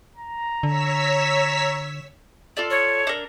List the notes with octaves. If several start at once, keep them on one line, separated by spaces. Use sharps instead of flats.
A#5
D3 C#5 E6 B6
F4 A4 D5
C#5
D4 A#4